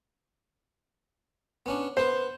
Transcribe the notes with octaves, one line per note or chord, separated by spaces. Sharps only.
B3 C#4 D4
B3 B4 C5